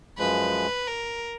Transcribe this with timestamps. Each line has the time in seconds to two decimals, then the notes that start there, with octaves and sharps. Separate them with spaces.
0.19 F#2 F3 G#3 B4
0.88 A#4